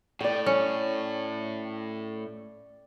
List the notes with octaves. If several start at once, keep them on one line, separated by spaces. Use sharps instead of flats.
A2 D5 G5
C#4